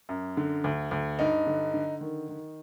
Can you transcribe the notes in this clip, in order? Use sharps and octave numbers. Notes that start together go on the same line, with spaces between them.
F#2
D3
D2
D2
G2 D#4
D3
D3
D#3
D#3